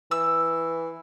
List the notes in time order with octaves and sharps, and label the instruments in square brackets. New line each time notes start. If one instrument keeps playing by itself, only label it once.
[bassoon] E3 [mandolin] E6